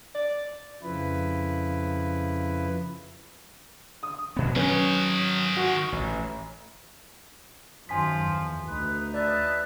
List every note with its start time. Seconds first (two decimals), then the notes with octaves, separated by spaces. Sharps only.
0.15 D5
0.83 F2 C#3 F3 E4 B4
4.03 D#6
4.36 D2 B2 B3
4.56 D#3 F#3 C#4 G#4 B4
5.57 F#4
5.92 A1
7.89 F#2 D#3 F3 G#5 C6 B6
8.24 E2
8.67 D2 D#4 B4
9.14 B4 D5 E5 A5